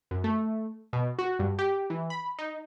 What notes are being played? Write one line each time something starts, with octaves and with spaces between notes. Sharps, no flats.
F#2
A3
B2
F#4
G2
G4
E3
B5
D#4